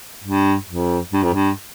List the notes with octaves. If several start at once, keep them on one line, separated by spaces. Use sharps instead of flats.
G2
F2
G2
F2
G2